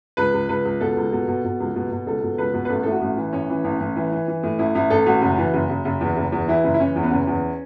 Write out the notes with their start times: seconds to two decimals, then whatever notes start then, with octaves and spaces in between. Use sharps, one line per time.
0.17 C#2 B4
0.34 C#2
0.49 C#2 B4
0.65 C#2
0.81 B2 A4
0.96 C#2
1.12 B2
1.28 B2
1.44 B2
1.60 C#2
1.75 B2
1.92 B2
2.07 C#2 A4
2.23 B2
2.38 C#2 B4
2.54 B2
2.65 B4
2.69 A1 A4
2.83 A2 A4
2.91 F#4
3.01 A1
3.17 E3
3.33 A1 C#4
3.49 E3
3.64 A1
3.80 A1
3.96 E3
4.12 E3
4.28 E3
4.43 A2
4.59 A1 E4
4.75 A1 E4
4.90 A1 A4
5.06 A1 F#4
5.22 F#1
5.38 E3
5.54 F#1
5.69 F#1
5.85 F#1
6.01 E2
6.16 F#1
6.32 E2
6.48 E3 E4
6.64 F#1
6.74 E4
6.80 E3 C#4
6.96 E2
7.03 B3
7.12 F#1 C#4
7.27 E2